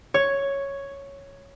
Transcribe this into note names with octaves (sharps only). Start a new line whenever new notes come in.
C#5